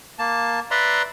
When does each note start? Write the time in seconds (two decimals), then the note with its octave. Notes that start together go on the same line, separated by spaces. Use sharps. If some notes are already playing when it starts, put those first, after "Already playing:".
0.19 A#3 A5
0.71 B4 D5 E5 A#5 C6